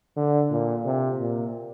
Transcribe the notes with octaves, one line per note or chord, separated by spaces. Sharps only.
D3
A#2
C3
A#2